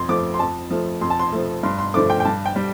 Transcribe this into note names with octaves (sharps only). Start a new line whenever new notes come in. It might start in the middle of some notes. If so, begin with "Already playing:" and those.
Already playing: F2 C6
F3 A3 D6
C6
F2 A5
F3 A3
F2 C6
A5
C6
F3 A3
G2 C6
C6
D3 F3 A3 D6
G5
G5
G2 A5
G5
G3